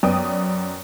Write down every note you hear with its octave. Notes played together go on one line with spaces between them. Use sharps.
F#2 B3 D5 G5 D#6